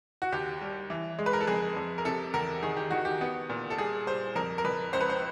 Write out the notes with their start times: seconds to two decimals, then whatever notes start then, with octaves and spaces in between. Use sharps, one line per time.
0.22 F#4
0.32 D#2 G4
0.61 G3
0.90 E3
1.19 G#3
1.26 B4
1.33 A#4
1.41 A4
1.47 F2 G#4
1.77 F2
1.98 A#4
2.05 C3 A4
2.34 E2 A#4
2.63 D#3 G#4
2.77 G4
2.91 D#3 F#4
3.05 G4
3.21 B3
3.50 A#2
3.70 A4
3.78 G3 G#4
4.07 G3 C5
4.36 F2 A#4
4.58 A#4
4.64 F2 B4
4.93 C#2 C5
5.01 B4
5.09 C5